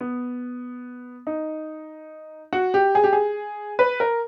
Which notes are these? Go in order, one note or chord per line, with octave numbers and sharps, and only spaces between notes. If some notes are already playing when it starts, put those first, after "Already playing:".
B3
D#4
F#4
G4
G#4
G4
G#4
B4
A#4